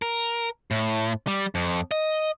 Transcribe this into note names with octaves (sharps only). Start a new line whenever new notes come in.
A#4
A2
G3
F2
D#5